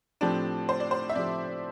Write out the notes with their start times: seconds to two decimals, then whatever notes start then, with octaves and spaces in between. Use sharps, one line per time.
0.21 A2 F3 C4 D4 G4
0.69 C5
0.80 D5
0.91 C5
1.09 E5
1.15 A2 F3 C4 G4 D5